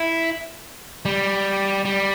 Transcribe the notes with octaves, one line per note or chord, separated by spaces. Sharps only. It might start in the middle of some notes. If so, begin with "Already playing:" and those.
Already playing: E4
G3
G3